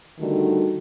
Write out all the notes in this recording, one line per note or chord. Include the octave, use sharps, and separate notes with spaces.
D3 D#3 G3 A3 F#4